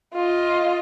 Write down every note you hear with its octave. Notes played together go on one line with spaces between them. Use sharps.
F4 D#5